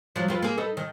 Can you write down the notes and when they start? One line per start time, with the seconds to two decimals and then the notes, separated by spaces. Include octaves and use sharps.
0.16 F3 F#3
0.28 F2 F4 B4
0.42 A#3 G#4
0.58 D#4 A4 B4
0.77 D#3